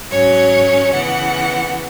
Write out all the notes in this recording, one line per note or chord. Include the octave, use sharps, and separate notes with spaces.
G#2 F#3 C#4 C#5
C#3 E3 B3 F#5